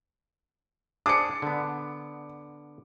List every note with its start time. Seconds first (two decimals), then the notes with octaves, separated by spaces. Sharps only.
1.06 D4 G#4 C5 D6 C#7
1.42 D3 B3